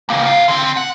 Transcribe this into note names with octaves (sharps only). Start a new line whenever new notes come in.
C#2 A#3
E4 F5
D3 C4
F#5